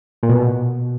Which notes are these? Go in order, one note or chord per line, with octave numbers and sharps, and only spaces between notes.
A#2
B2